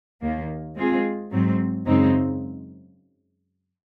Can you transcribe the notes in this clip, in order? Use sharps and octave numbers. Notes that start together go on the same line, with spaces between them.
D#2 D#3 A#3
G#3 C4 F4 G#4
G#2 F#3 C4
F#2 C#3 G#3 C4 D#4